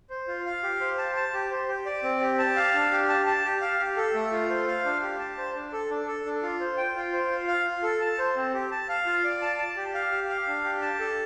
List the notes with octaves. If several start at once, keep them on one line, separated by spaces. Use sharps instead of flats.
C5
F4
F5
G4
C5
A5
A5
G4
C5
G4
D5
C4
G4
A5
F5
D4
G4
A5
A5
G4
F5
G4
A4
A3
F4
C5
F5
D4
G4
A5
C5
D4
A4
D4
A4
D4
F4
C5
G5
F4
C5
F4
F5
F4
A4
A5
C5
C4
G4
A5
F5
F4
D5
A5
A5
G4
F5
G4
F5
D4
G4
A5
A4